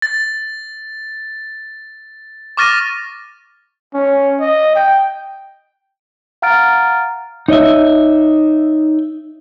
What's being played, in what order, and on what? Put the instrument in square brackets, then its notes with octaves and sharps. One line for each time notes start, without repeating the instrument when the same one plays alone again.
[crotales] A6
C#6 D6 F6 A6 A#6 D#7
[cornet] C#4
D#5
G5
[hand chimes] F5 F#5 A#5 F6 A6 D7
[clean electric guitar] D#4 C#5 D#5 E5